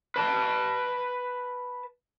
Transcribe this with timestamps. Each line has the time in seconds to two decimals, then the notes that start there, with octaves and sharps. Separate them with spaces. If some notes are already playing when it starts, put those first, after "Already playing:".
0.16 B4 A5